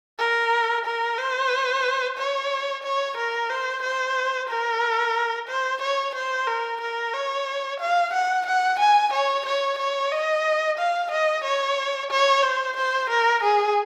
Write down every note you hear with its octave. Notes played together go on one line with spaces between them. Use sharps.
A#4
A#4
C5
C#5
C#5
A#4
C5
C5
A#4
C5
C#5
C5
A#4
A#4
C#5
F5
F#5
F#5
G#5
C#5
C#5
C#5
D#5
F5
D#5
C#5
C#5
C5
C5
A#4
G#4